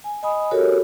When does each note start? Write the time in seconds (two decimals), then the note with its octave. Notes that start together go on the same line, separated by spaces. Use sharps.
0.04 G#5
0.23 D#5 G#5 B5 D#6
0.51 F#4 G4 A4 A#4 C#5